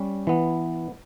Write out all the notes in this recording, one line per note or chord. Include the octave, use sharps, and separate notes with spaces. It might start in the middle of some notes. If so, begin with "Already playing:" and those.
Already playing: G3 C#4
E3 B3